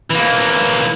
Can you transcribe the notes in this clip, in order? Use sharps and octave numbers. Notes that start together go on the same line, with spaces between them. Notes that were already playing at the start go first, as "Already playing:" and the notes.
E3 A#3